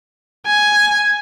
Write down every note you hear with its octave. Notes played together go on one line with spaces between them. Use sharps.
G#5